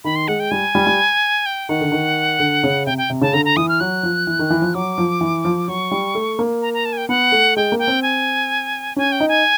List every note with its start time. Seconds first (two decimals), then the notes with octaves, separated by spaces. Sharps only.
0.04 D#3 B5
0.16 C6
0.28 G#3 F#5
0.40 G5
0.51 G3 G#5
0.75 G3
0.87 G3
1.46 G5
1.69 D#3 F#5
1.81 D3
1.92 D#3
2.39 D3
2.63 C#3
2.86 C3 G5
2.98 G5
3.10 C3
3.22 C#3 A5
3.33 D3 A#5
3.45 A#5
3.57 E3 D#6
3.69 F6
3.80 F#3 F#6
4.03 F3
4.27 E3
4.39 D#3
4.50 E3
4.62 F3
4.75 F#3 D6
4.98 F3
5.21 E3
5.45 F3
5.68 F#3 C#6
5.91 G3
6.15 A3
6.39 A#3
6.62 A#5
6.74 A#5
6.85 A5
6.93 G#5
6.97 G5
7.08 B3 F#5
7.32 A3
7.57 G#3 G5
7.72 A#3
7.79 G5
7.87 C4
8.02 G#5
8.96 C#4 G#5
9.12 G5
9.20 D#4
9.28 G#5